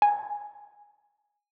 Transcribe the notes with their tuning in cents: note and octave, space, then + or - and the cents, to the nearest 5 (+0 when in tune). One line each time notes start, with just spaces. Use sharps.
G#5 -10